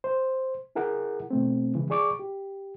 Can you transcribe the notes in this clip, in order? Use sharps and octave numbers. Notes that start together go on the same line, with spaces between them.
C5
E4 G#4 A#4 F#5
B2 A3 C4
C#3 E3 G#3
G#4 D5 C#6 D6
G4